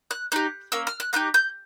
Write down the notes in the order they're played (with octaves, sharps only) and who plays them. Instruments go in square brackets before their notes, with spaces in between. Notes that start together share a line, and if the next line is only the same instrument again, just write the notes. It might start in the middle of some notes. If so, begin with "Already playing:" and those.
[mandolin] F#6
B3 D#4 G4 F#6
A#3 C#4 E6
F6
F#6
A#3 D#4 G4 F#6
G6